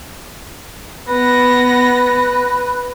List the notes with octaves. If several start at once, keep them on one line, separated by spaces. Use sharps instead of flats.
B3 B4 A#6